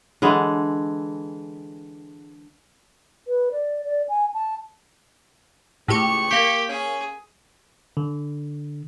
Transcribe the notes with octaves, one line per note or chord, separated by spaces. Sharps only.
D3 E3 G#3
B4
D5
D5
G#5
A5
C#2 A2 G4 C#6
A#3 G4 B6
C#4 G#4
D3